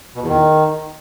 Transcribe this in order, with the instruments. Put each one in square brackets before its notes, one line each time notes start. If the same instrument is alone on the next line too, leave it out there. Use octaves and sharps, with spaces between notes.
[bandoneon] B2
E2
D#3